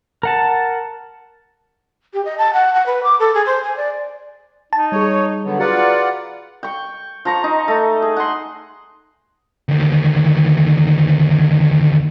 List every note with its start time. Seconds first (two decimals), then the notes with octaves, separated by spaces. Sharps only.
0.23 A#4 F#5 A5
2.14 G4
2.25 D#5
2.38 A5
2.53 F#5
2.74 F#5
2.86 B4
3.03 D6
3.20 A4
3.34 G#4
3.46 C5
3.64 G#5
3.77 D5
4.73 D#4 A5
4.92 G3 G#4 C#5
5.45 D3 F#3 B3
5.59 F4 F#4 G#4 B4 D5 F#5 A#5
6.63 G5 C#6
7.25 F3 A#5 C#6
7.44 D#4
7.68 A3
8.02 G#4
8.16 F#5 C6
9.68 D2 D#3